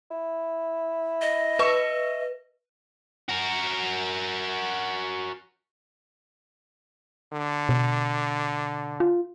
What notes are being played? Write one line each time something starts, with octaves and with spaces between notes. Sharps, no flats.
E4
D#5
B4 E5 C#6
F#4 A#4
D3
B2
F4